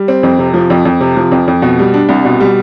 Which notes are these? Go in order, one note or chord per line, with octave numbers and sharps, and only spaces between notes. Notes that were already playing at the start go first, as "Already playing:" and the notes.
Already playing: G3
C4
F2
C3
F3
F2
F2
C3
F3
F2
F2
B2
G3
D4
C2
B2
G3